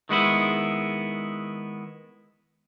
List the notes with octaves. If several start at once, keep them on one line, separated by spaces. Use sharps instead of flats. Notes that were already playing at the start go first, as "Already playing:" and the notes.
D#3 G#3 B3 E4